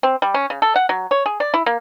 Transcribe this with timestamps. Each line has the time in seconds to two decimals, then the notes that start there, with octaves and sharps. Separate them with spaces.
0.03 C4
0.22 G3
0.34 C#4
0.50 C#3
0.62 A4
0.76 F#5
0.89 F#3
1.11 C#5
1.26 G#4
1.40 D5
1.54 E4
1.66 A#3